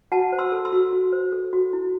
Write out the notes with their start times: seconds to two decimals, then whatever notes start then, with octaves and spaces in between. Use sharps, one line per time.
0.12 F#4 F#5 A5
0.32 C5
0.38 C6 E6
0.52 A4
0.65 C6 E6
0.73 F#4
0.93 F#4
1.12 C5
1.32 A4
1.53 F#4
1.73 E4